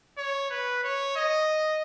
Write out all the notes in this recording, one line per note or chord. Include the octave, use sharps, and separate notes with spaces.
C#5
B4
C#5
D#5